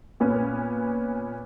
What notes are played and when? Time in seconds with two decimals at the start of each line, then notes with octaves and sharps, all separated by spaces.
0.20 A#2 B3 C#4